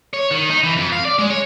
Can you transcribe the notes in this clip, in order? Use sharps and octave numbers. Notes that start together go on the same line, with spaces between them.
C#5
D#3
D#4
E3
F2
F5
D5
G#3
C#5